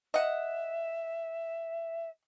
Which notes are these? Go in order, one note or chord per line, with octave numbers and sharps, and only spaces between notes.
D#5 E5 F#5